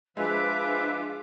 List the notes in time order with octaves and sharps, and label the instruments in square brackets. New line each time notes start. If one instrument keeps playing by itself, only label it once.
[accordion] F3 B4 E5 [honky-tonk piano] G#3 [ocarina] D4 [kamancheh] F4 D6